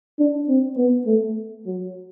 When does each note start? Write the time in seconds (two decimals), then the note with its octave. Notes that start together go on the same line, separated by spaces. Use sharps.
0.19 D4
0.48 C4
0.77 B3
1.06 A3
1.66 F#3